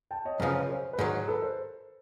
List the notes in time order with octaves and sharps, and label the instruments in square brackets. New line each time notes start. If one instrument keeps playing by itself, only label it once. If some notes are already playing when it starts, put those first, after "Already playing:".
[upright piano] G5 A5
C#5 D#5
[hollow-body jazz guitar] F#2 C#3 F3 [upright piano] B4 C#5
[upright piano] B4 C#5
A#4 C5
B4
[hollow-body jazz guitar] G#2 D#3 F#3 [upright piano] G#4 A#4
[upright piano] A4 B4
A#4 C5